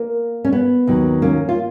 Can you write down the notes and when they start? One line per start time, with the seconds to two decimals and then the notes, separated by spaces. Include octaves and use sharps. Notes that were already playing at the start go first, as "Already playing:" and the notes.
Already playing: A#3
0.45 C#4
0.52 B3
0.87 D#2 D#3 F#3
1.22 A#3 C#4
1.49 F4